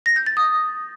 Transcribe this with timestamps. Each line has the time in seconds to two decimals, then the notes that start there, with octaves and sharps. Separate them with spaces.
0.06 A#6
0.16 G6
0.26 A6
0.37 D#6